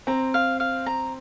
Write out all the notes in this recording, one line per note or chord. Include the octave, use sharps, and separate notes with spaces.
C4 A#5
F5
F5
A#5